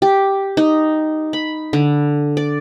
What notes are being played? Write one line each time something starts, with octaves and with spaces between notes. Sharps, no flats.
G4
D#4
B5
D3
D5